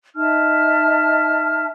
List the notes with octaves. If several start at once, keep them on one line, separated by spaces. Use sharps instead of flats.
D#4 E5 A5 F6